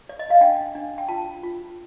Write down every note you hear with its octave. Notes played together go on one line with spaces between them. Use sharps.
D5
D#5
F5
D4 G5
D4
G5
F4 A5
F4